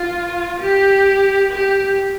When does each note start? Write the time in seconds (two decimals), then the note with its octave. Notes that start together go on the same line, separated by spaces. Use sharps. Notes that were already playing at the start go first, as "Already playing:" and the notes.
Already playing: F4
0.60 G4
1.51 G4